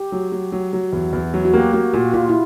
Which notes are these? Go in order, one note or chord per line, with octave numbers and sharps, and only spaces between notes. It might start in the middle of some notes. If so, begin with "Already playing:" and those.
Already playing: G4
F#3
F#3
F#3
F#3
E2
E2
F#3
F#4
A#3 G4
A#3 F#4
A#2 F#4
A#2 F4
E4